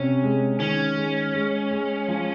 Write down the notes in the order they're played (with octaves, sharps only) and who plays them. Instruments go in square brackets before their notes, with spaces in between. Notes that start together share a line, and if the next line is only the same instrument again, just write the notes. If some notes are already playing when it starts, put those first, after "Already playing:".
Already playing: [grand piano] C3 [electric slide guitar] C#4
[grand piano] G#3
[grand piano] D#3 [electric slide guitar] C#4
[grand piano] G#3
G#3
G#3
F3